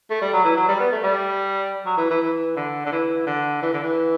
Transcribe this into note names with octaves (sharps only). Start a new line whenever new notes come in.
A3
G3
F#3
E3
F#3
G3
B3
A3
G3
F#3
E3
E3
E3
D3
D3
E3
D3
E3
D3
E3